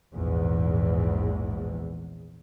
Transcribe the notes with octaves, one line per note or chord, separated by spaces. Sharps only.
A#1 E2 G#2